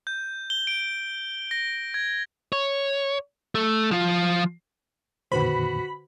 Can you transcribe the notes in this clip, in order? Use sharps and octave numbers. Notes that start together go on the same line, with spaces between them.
G6
G7
D7
A#6
G#6
C#5
A3
F3 F4
F2 A#2 D3 D#3 F#4 B4 C5 B5